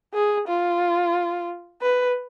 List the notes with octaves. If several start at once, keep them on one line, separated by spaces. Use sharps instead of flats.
G#4
F4
B4